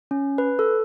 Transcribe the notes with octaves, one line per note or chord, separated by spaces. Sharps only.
C#4
B4
A4